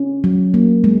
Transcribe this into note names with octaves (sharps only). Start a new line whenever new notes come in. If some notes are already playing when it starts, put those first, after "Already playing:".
Already playing: C#4
F#3
A#3
G#3